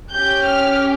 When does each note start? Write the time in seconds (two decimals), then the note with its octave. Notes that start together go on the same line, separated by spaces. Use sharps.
0.12 C#4 G4 G6
0.45 F6